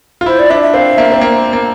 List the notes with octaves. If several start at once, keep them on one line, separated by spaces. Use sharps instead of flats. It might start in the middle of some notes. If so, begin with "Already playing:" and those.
F4
E4 C5
D5
D4 E5
E5
C4 F5
A#3 E5
C4
A#3
A#3